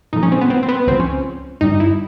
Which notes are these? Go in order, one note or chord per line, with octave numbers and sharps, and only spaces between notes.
A#2 F3 A3 D#4
C#4
C4
B3
C4
C4
B3
C#2 C#3 F3 C4
C#4
G2 D3 G3 D#4
E4